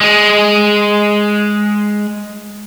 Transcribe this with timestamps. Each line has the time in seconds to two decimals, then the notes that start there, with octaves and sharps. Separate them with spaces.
0.01 G#3 G#4